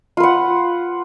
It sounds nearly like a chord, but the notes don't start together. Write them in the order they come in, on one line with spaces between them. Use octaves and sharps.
F4 B4 F#5